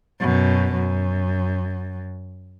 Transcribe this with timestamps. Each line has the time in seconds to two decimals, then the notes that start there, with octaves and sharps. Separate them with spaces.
0.20 F#2 B2
0.73 F#2